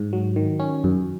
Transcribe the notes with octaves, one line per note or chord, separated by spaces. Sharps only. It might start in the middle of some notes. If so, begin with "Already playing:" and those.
Already playing: G#2
F#3
D#3
C#4
F#2